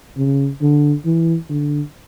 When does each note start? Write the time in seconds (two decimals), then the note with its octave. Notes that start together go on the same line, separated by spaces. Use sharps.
0.17 C#3
0.62 D3
1.05 E3
1.50 D3